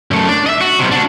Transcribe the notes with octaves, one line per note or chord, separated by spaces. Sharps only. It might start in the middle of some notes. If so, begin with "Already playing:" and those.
F#2 A3
D4 D5
D#5 E5
F#4
B1 C3
D4 F#4